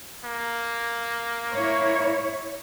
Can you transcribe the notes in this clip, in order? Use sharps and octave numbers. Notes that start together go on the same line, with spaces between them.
A#3
E4 C#5